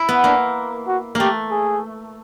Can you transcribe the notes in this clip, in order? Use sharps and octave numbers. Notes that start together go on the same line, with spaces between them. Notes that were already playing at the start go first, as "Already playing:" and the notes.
Already playing: E4
B3
A#3 D4
F#4
A3 A#3 G4
G#4